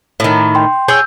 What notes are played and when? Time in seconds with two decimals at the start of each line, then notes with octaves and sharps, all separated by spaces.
0.20 A2 D#3
0.55 G5 C6
0.88 G#4 C#5 G5 E6 G6